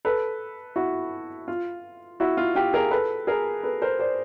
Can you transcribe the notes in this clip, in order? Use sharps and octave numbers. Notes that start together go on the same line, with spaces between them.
A4 B4
E4 F#4
F4
E4 F#4
F4
F4 G4
G#4 A#4
A4 B4
G#4 A#4
A4 B4
A#4 C5
C5 D5